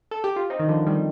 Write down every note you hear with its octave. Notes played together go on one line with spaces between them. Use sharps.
A4
G4
F4
C4 D#4
D#3
D3 F3
D#3 G3